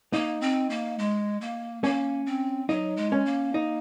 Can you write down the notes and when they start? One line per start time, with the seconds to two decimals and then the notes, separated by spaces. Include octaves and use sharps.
0.13 A#3 D#4
0.41 C4
0.70 A#3
0.99 G#3
1.41 A#3
1.83 A#3 C#4
2.26 C4
2.69 F#3 D#4
2.97 G#3
3.12 C#4
3.26 A#3
3.54 D#4